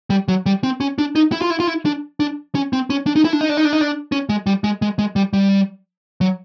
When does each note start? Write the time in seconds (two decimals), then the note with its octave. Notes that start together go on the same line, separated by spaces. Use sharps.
0.10 G3
0.28 F#3
0.46 G3
0.64 C4
0.80 C#4
0.98 D4
1.16 D#4
1.32 E4
1.42 F4
1.50 E4
1.60 F4
1.67 E4
1.86 D4
2.20 D4
2.55 C#4
2.73 C4
2.90 C#4
3.07 D4
3.16 D#4
3.25 E4
3.33 D4
3.41 D#4
3.49 D4
3.57 D#4
3.65 D4
3.73 D#4
3.81 D4
4.12 C#4
4.29 G#3
4.47 G3
4.64 G#3
4.82 G#3
4.99 G#3
5.16 G3
5.33 G3
6.21 F#3